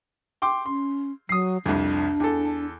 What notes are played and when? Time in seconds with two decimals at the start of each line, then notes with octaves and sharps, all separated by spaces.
0.42 G5 C6 D6
0.66 C#4 C6
1.29 F#3 D#6 C7
1.66 C2 F2 D4
2.20 E2 A4